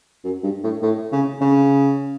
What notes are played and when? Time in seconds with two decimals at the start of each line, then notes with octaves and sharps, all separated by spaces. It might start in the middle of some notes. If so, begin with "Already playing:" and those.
0.24 F#2
0.43 G2
0.63 A2
0.82 A2
1.12 C#3
1.41 C#3